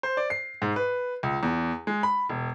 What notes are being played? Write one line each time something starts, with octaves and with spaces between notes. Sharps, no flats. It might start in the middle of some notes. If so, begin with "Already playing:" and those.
C5
D5
C7
G#2
B4
C#2
E2
G#3
B5
E1